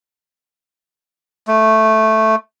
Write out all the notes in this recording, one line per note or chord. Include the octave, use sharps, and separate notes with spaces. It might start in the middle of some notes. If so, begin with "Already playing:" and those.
A3